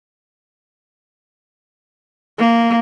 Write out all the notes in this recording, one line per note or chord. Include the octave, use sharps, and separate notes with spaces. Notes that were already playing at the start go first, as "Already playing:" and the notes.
A#3